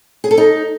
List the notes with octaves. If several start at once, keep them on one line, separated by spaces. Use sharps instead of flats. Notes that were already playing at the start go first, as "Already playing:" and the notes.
G#4
A4
D#4